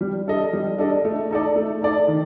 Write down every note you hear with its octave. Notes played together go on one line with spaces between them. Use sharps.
G3
D4 A4 D#5
G3
D4 A4 D#5
A3
D#4 A4 D5
A3
D#4 A4 D5
D#3